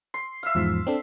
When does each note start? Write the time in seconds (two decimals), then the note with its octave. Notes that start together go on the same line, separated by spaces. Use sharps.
0.14 C6
0.43 E5 F5
0.55 E2 G#2 F3
0.87 C4 D4 A4